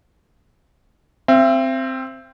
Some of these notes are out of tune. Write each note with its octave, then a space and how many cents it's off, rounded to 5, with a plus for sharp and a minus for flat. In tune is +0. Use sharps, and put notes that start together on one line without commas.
C4 +0 E5 +40